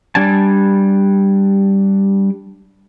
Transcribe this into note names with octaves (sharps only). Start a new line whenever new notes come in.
G3 D4 G#5 A5